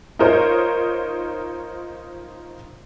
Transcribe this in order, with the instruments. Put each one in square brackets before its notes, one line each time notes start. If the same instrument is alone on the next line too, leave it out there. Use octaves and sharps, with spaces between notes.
[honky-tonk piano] D#4 F4 A#4 C5 C#5 D#5